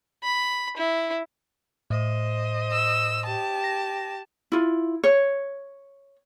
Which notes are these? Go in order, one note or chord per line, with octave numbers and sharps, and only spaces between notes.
B5
E4
A2 C5 D#5
E6
G4 A5
A#6
E4 F4
C#5